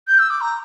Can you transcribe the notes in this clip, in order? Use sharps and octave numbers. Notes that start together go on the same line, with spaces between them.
G6
E6
D6
A#5